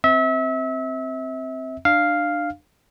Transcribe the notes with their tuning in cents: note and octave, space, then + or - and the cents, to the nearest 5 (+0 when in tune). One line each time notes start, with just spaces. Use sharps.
C4 +0 E5 -30
D4 +25 F5 +0